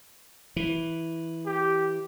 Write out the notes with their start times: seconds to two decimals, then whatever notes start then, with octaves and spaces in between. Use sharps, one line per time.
0.56 E3
1.46 G4